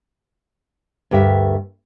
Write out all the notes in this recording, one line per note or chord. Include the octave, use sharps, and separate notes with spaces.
D2 G2 G4 A#4 E5